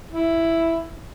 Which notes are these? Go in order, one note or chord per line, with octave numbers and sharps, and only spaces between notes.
E4